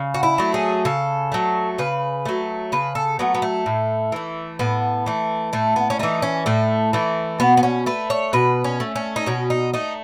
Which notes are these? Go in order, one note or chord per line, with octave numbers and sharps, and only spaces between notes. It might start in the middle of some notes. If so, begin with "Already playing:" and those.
Already playing: C#3
F#4
E4
F#3 A3
G#4
C#3 A4
F#3 A3
C#3 B4
F#3 A3
C#3 B4
A4
F#3 A3 B3
B3
A3
A2
E3 A3
A2 B3
E3 A3
A2 A3
B3
C#4
E3 A3 D#4
C#4
A2 A3
E3 A3
B2 B3
B3
C#4
A3 B4
C#5
B2 B4
C#4
A3
C#4
D#4
B2 C#4
D#4
A3 D#4